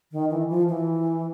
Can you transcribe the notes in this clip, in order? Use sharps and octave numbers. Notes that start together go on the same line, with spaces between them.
D#3
E3
F3
E3